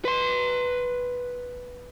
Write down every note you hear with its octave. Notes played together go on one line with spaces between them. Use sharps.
B4 C6